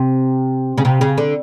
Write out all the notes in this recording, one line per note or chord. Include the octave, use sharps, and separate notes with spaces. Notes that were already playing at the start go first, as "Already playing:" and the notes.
Already playing: C3
C#3
C3
C#3
D3